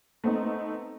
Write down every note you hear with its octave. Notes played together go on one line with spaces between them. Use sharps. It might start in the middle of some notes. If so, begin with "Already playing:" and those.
A3 B3 C4 D#4